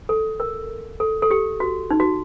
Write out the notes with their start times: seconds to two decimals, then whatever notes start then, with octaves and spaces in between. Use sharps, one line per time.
0.09 A4
0.40 A#4
1.00 A4
1.22 A4
1.31 G4
1.60 F#4
1.90 D#4
2.00 F#4